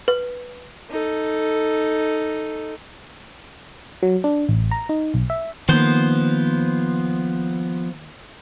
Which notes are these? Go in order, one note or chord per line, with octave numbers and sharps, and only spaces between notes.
B4
D#4 A4
F#3
D4
A1
A#5
D#4
B1
E5
D#3 F3 A#3 B3 C5